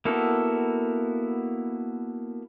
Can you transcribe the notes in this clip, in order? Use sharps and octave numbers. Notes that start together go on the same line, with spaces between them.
A#3 B3 E4 F#4 A4